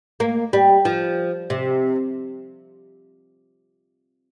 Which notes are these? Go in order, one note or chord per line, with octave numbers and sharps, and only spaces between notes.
A#3
G3
F3
C3